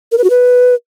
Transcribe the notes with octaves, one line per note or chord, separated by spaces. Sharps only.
A#4
B4
F#4
B4